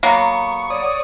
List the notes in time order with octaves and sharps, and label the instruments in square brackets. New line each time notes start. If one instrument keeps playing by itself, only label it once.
[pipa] F#3 A#3 B3 [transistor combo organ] C#6
[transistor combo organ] C#5 D5 D#6